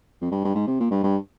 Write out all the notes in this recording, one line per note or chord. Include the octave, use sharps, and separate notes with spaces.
F2
G2
G2
G#2
C3
A#2
G2
G2